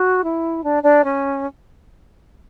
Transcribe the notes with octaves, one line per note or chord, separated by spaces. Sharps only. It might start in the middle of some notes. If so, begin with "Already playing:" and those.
Already playing: F#4
E4
D4
D4
C#4